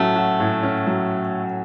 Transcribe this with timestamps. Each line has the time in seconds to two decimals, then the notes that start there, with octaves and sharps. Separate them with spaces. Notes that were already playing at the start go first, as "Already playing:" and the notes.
Already playing: A2 F#3 A3 C#4
0.16 F#4
0.40 A2
0.63 C#4
0.87 F#3